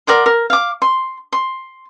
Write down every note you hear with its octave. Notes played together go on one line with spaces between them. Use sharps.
A#4 D5 F#5 C6
A#4
F5 D6
C6
C6